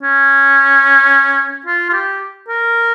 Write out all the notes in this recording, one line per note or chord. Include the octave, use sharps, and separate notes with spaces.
C#4
F4
F4
G4
A#4